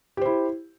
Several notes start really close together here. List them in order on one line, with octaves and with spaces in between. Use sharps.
G4 C5 E4